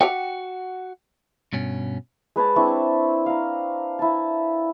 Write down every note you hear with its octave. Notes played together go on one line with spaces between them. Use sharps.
F#4 G4 E5 F#5 G5
G2 B2 C#4
G#3 B4 C#5 A5
C4 D4 E4 C#6
F5 A#5
E4 A5